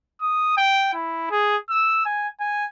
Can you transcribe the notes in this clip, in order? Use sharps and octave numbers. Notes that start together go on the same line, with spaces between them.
D#6
G5
E4
G#4
E6
G#5
G#5